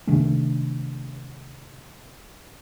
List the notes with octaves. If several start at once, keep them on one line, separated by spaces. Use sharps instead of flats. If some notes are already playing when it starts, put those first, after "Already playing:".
C3 D#3 A3 D4